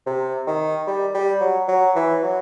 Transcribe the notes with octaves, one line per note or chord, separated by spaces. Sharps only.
C3
D#3
G3
G3
F#3
F#3
E3
F#3